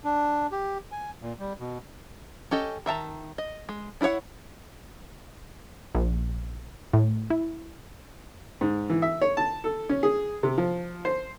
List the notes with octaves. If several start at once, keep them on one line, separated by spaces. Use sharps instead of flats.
D4
G4
G#5
A#2
G3
B2
C#4 G4 A4 D#5
D#3 E5 A5 A#5
D#5
G#3
D4 E4 G#4 C#5 F#5
A#1
A2
E4
G#2
E3
E5
C#5
A5
A4
C#4
G#4
C3
F3
C5